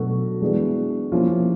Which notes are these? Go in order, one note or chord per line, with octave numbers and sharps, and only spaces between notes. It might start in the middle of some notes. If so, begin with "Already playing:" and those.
Already playing: B2 F#3 A3 D4 F#4
E3 G#3 B3 D4
F3 A#3 C#4 E4 F4